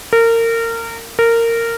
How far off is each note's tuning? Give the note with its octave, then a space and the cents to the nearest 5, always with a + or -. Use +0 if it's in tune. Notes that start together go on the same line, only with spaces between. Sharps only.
A#4 -25
A#4 -15